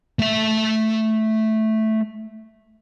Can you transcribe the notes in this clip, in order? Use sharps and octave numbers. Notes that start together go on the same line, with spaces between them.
A3 E5